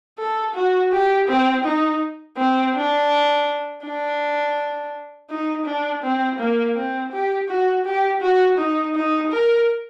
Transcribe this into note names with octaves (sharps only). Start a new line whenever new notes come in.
A4
F#4
G4
C4
D#4
C4
D4
D4
D#4
D4
C4
A#3
C4
G4
F#4
G4
F#4
D#4
D#4
A#4